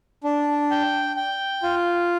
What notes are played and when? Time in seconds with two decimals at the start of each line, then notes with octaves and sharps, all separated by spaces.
0.24 D4
0.71 G5
1.16 G5
1.63 F4